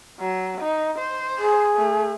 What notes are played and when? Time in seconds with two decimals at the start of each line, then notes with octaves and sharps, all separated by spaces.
0.20 F#3
0.61 D#4
0.98 C5
1.38 G#4
1.76 A3